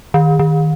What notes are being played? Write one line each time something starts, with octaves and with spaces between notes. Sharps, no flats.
D#3
D#3